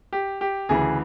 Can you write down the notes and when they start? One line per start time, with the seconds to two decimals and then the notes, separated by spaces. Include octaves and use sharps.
0.13 G4
0.41 G4
0.69 D2 C#3 E3 G#4